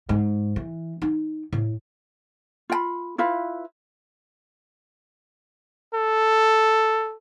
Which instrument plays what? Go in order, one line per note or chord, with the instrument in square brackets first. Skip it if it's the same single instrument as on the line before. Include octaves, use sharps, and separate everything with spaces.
[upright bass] G#2
E3
D#4
A2
[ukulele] F4 G5 B5
E4 F4 B4 F5
[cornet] A4